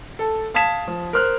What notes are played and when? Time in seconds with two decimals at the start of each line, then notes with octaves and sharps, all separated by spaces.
0.19 A4
0.54 F5 A5 D#6 G#6 B6 E7
0.88 F3
1.13 A#4 C5 F6 F#6